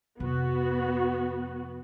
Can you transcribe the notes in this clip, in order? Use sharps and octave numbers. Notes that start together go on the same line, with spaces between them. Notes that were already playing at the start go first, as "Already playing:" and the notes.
F2 C3 B3 F#4